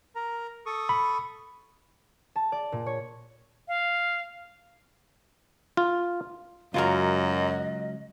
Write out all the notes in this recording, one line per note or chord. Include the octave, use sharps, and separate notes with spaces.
A#4 A#5
A4 C#6 D#6
B5
A5
D5
A#2
C#5
F5
F4
C#2 F#2 F#3 F4 F#4 A#4 D#5